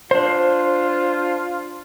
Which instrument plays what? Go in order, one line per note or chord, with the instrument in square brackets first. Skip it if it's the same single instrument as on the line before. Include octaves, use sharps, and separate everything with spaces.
[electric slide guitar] D4 C5 [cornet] F4